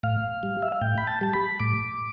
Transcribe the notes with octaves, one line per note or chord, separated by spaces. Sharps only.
A2 F5
G3
E5
F5
A2 G5
B5
A5
G3 A5
B5
A2 D6